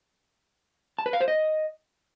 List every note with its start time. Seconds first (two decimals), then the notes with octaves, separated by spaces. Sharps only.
0.99 A5
1.06 B4
1.13 F5
1.20 C5
1.28 D#5